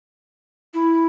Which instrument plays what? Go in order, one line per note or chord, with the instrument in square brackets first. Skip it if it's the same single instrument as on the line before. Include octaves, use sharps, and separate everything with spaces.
[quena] E4